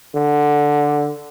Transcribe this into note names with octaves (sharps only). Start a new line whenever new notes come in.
D3